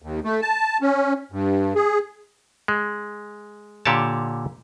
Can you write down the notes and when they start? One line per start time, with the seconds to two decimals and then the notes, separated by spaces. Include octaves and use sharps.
0.02 D#2
0.24 A3
0.42 A5
0.82 C#4
1.32 G2
1.75 G#4
2.68 G#3
3.85 A#2 D3 G4 C#5 A5